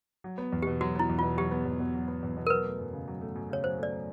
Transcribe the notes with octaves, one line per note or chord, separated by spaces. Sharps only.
F#3
B3
E2
G4
B2
F#3 F#4
B3 E4
E2
F4
B2
F#3 G4
B3
E2
B2
F#3
B3
E2
B2
A#4
F#3 B4
A3
F#2
C#3
F#3
A3
F#2
C#3 C#5
F#3 C5
A3 D5